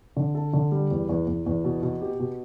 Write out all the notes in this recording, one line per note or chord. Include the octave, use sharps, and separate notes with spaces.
D3
A4
D3
G3
E2
E2
E2
E2
B2
B2
G4
B2